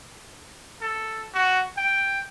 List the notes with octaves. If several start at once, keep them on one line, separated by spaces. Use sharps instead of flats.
A4
F#4
G5